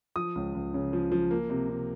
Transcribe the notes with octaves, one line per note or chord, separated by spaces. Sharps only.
F3 D#6
C#2
C#2
C#3
F3
F3
A#3
C3
C3